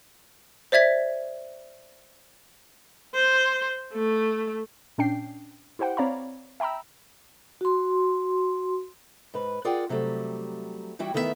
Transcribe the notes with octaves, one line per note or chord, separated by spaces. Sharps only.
C5 D5 E5 G#6 B6
C5
A3
A#2 C#4 D4 G5 C7
E4 G4 C5 F#5 G5
C4 C#5 D5 F5 A#5 B5
E5 G5 A#5 B5 E6
F#4 C6
G#2 B4
F4 G#4 A#4 D5 F#5 G5
C3 F#3 G3 A3
E3 G3 E4 F#4 G5
E2 D#3 A3 B3 G#4 E5